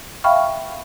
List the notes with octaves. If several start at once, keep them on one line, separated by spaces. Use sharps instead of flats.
E5 F5 G5 B5 C#6 F6